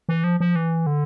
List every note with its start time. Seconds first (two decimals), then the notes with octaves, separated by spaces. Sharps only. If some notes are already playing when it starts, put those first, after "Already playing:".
0.09 E3
0.24 F3
0.40 F3
0.56 E3
0.87 D3